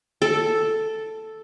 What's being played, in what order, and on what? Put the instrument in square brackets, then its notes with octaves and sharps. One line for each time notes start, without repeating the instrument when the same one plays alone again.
[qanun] A4